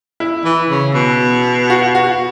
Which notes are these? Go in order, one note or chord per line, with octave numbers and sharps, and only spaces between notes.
E4
E3
C#3
B2
F#4
F#4